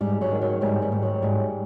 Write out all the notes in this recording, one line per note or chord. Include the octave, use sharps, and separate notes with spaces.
G#2 G3
F#3
D#3
F#3
G#2 G3
G3
G#2
F#3
G#2 G3